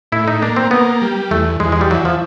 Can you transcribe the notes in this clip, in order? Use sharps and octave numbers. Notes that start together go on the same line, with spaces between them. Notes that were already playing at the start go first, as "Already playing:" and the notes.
A2 E4
D#4
A#3 D4
C4
A#3 B3
G3
E2 A3
E2 G#3
G#3
G3
E3 F#3
F3